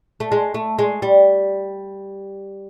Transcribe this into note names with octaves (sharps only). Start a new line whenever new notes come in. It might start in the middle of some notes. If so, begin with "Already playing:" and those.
A3
G#3
A3
G#3
G3